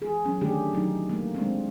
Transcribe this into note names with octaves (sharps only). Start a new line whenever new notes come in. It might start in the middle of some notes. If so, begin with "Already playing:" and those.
E3 G#4
F#3 C#4
D3 D#3 A3 D4 G4 G#4
B2 F#3 D#4
A3 A#3
G#3 C4 D4